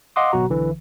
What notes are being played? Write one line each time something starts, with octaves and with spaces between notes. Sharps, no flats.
D#5 F5 F#5 C6 D6 D#6
G#1 B2 F#3 F#4 A#5
B1 D3 E3